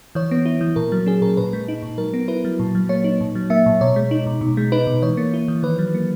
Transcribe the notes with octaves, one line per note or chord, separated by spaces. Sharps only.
E3 C#5
B3
E4
E3
A#2 A#4
F#3
C#4 G#4
A#2 A#4
A#2 B4
G#3
D#4
A#2
F#3 A#4
B3
E4 B4
F#3
A#2
F#3
A#3 C#5
D#4
A#2
F#3
A#3 E5
A#2
B2 C#5
G#3
D#4
B2
B2
G#3
D#4 B4
B2
E3 C#5
A#3
E4
E3
D#3 B4
F#3
A#3